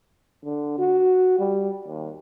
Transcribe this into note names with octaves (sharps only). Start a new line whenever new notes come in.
D3
F#4
G3
D#2